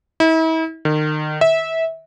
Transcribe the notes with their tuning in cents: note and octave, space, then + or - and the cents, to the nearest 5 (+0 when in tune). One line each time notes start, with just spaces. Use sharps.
E4 -40
D#3 -30
E5 -20